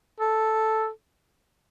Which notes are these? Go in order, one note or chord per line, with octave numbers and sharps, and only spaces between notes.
A4